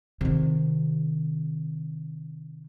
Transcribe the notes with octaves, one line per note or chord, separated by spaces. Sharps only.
C3 D#3